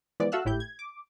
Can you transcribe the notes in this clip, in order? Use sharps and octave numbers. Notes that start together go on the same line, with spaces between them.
E3 F3 G#3 B3 D5
F#4 A4 E5 F5 E6 F#6
G#1 A2 E4 G4 G6
G#6
D6